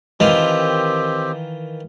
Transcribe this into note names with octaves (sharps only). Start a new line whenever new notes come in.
D#3 E3 C4 F4 G4 D#5